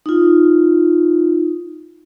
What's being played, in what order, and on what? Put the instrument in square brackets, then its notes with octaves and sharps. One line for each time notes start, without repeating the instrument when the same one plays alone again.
[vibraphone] D#4 F4